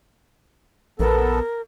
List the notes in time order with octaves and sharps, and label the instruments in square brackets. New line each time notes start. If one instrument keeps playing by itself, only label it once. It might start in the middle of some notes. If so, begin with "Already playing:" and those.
[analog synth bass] A#1 [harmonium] B3 A4 [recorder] A#4